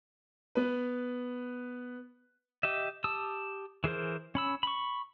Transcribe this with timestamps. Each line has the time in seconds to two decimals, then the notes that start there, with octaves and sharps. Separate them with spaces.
0.55 B3 B4
2.63 G4 D#5 E5
3.04 G4 A5 D#6 E6
3.84 E3 G#4 A#4 C5
4.35 C#4 B5 E6
4.63 B5 C#6